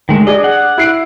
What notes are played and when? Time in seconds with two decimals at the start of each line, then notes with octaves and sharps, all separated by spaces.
0.09 D#3 G#3 A3
0.27 D4 G#4 D#5 D6
0.44 F#5
0.78 E4 C7 D7